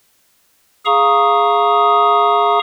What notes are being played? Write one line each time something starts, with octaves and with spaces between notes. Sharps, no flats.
G#4 F5 A#5 C#6 D#6